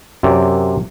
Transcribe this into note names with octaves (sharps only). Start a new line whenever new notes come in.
F#2 C3 D5